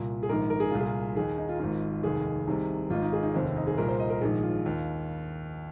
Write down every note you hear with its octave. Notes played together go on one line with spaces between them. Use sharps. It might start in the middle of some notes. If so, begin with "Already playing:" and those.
Already playing: C2 A#2
G#4
A#1 G#2 D#3 A#4
A#4
G#4
C2 A#2 F4
G#4
D#2 D#3 G#4
D#4
F4
G#1 G#2 D#3 F4
F1 D#2 D#3 G#4
C2 C3 D#3
G#1 G#2 D#3 F4
D#4
G#4
D#4
F1 D#2 D#3 C4
C4
D#4
G#4
C2 A#2 A#4
C5
D#5
A#4
A#1 G#2 D#3 G#4
F4
D#2 D#3